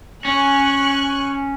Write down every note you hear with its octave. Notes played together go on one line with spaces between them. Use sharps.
C#4 G#5 C#6 F#6